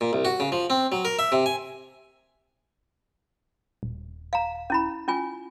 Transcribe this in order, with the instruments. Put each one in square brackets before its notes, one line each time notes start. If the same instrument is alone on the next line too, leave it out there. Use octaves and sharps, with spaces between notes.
[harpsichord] A#2
C2
F#4
C#3
F3
C4
F#3
A#4
E5
C3
G#5
[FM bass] D#1
[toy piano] F5 A#5
C#4 E4 B5
C#4 F4 G#5